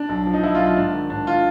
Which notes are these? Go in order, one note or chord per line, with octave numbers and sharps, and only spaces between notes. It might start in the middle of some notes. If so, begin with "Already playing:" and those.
Already playing: D4
B1
F3
D#4
F3 E4
F4
B1
F4
G#2 D4
D#3
G#2 D4
F4